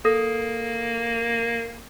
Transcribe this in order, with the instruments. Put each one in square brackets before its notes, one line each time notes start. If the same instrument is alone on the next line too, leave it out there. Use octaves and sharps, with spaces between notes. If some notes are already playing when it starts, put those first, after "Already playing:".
[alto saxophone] A#3 [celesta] A4 D#6 A#6